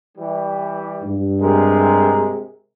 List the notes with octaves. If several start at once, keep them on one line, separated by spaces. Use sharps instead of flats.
E3 G3
G2
C3 G#3 A#4